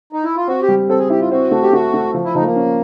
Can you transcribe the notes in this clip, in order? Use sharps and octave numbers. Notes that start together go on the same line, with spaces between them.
D#4
E4
F4
C4 F#4
G4
G3
C4 A4
G#4
E4 G4
F4
C4 F#4
A3
G4
A3 F#4
A3
F3
E4
F3 D#4
A3
A#3
C#4